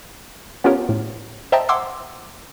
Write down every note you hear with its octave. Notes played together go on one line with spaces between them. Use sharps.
B3 C#4 F4 G4 A#4 C#5
A2
C5 D#5 E5 G5 A5 A#5
F#5 C6 D6 E6 G#6 C7